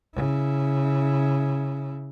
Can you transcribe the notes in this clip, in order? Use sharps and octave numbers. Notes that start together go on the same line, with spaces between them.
C#3 E4